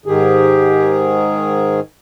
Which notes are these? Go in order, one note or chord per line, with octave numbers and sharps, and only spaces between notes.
G#2 D#3 G4 G#4